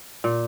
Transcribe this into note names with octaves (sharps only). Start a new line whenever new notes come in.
A#2